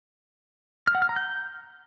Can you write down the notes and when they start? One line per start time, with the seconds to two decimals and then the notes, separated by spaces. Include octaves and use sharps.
0.87 F6
0.95 F#5
1.02 F6
1.09 A#5
1.16 G6